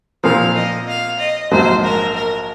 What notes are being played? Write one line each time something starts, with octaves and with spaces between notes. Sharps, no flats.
A#2 F3 C4 F5
D#5
F5
D#5
A#1 G#2 F#3 A#3 C5
A#4
A#4